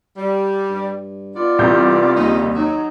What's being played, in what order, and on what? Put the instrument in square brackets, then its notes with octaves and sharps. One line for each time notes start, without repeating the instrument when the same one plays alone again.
[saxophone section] G3
[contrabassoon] G2
[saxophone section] B3 D#4 D5 [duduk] F4
[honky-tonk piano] C2 G6 [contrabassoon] E3
[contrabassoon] D#2 [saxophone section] C#3 G3 D#4
[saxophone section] F#3 [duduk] D#4